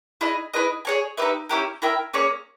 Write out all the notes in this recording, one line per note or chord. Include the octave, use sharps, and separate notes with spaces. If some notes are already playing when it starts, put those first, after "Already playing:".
E4 G#4 D#5
E4 G#4 B4 D#5
G#4 C#5 G#5
D#4 G4 B4 E5
C#4 E4 G4 A#4
E4 A#4 E5 G5
A#3 C#4 G#4 C#5